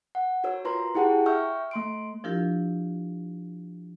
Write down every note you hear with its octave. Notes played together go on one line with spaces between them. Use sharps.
F#5
F#4 A#4 C#5 E6
F4 B4 A#5 C6
E4 G4 G#4 F#5 G5 A5
E5 G5 C#6 E6 F6 G6
A3 C6 D7
F3 D4 E4 F4 G4 A#4